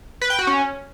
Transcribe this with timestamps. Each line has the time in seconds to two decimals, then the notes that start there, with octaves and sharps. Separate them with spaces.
0.21 B4
0.30 G5
0.39 F#4
0.47 C#4